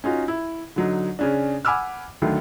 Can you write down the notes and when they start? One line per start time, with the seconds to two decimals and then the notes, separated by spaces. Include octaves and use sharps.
0.04 C#4 D#4 F4 F#4
0.28 E4
0.76 D3 F#3 D#4
1.19 C#3 C#4 D4
1.65 F#5 G#5 B5 D6 E6 F6
2.22 D2 D3 D#3 F#3